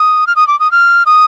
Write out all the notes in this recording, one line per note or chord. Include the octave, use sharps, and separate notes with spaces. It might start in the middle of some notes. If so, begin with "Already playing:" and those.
Already playing: D#6
F6
D#6
D6
D#6
F6
D#6